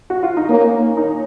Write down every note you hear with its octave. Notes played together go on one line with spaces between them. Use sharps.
F#4
F4
D#4
A#3 C#4
D#4